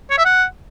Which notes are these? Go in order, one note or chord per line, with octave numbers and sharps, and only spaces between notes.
C#5
E5
F#5